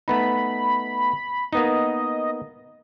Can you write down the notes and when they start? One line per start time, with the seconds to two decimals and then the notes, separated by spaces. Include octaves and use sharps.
0.08 A3 B3 D#4 B5
1.53 A#3 B3 D#4 D#5